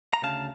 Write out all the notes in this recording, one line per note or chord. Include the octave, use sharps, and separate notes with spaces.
A#5
D2 C#3 F5 A5